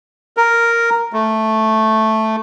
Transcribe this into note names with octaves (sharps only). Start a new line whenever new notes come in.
A#4
A3